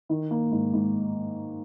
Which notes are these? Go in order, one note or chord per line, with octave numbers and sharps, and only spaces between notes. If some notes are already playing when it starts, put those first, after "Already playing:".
D#3
A#3
G#2
G#2